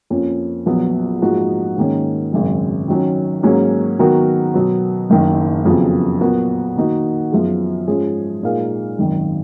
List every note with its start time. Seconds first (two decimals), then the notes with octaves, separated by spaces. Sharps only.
0.10 F2 F3 A#3 C#4
0.66 A#1 A#2 F#3 B3 F#4
1.22 G#2 F3 A#3 D#4 F#4
1.77 G#2 D#3 A#3 C#4
2.32 G#1 F#2 C#3
2.88 D#3 F#3 C#4
3.43 G#2 F#3 A#3 C#4
3.99 D#3 F#3 B3 F#4 A#4
4.54 B2 F#3 B3
5.10 F#1 F#2 D#3
5.66 F2 C#3 F#3 B3
6.21 A#2 F#3 B3 F#4 A#4
6.76 D#3 A#3 D#4 F#4
7.32 F#2 F3 B3 F4 G#4
7.88 G#2 F3 G#3 C#4 G#4
8.43 A#2 G#3 D#4 A#4 F5
8.99 G#1 F#2 D#3